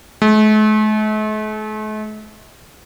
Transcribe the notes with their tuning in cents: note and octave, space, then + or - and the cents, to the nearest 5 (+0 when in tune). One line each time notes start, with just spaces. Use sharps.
A3 -45